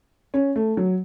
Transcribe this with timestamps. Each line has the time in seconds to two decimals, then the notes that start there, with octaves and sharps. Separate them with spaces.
0.34 C#4
0.56 A3
0.77 F#3